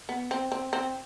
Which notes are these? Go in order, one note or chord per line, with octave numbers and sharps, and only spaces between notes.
B3
C4
C4
C4